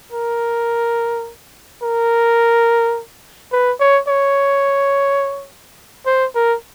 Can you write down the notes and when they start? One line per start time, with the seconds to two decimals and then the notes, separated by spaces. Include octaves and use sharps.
0.12 A#4
1.82 A#4
3.52 B4
3.80 C#5
4.08 C#5
6.06 C5
6.35 A#4